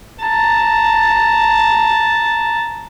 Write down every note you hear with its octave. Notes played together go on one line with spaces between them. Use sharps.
A5 A#5